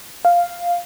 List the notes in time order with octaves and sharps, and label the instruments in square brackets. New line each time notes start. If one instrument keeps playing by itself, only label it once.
[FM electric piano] F5